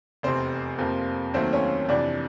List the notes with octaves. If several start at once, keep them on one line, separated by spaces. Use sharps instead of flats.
F1 E2 C3 C4 C5
F2 C3 F3 A#3
D#2 D#3 F#3 A3 C4 C5
C#4 C#5
F2 C3 E3 D4 D5